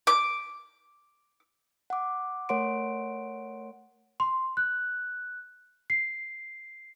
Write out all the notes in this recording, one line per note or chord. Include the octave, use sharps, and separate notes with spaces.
D6
F#5 D6
A3 A#4 C#5 F#5 C6 D7
C6
F#6
C7